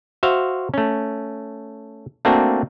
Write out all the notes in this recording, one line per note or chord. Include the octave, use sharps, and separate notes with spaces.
F#4 C5 E5 F5
A3 C#4
A3 A#3 C4 D4 F#4